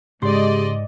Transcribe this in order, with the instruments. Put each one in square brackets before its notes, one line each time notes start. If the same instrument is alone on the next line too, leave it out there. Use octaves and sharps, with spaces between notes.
[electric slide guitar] G#2 [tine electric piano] C#3 C6 [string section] G#3 D5 D#5 [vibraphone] G4 G#4